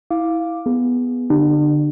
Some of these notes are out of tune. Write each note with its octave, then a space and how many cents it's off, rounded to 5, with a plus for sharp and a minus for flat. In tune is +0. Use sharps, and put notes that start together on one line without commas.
E4 -20 F5 +0 D6 +0
B3 +0 G#4 +0
D3 -5 D4 +40 G4 -10